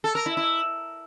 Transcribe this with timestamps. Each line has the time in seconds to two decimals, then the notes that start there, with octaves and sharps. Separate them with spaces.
0.04 A4
0.15 A#4
0.26 E4
0.37 E4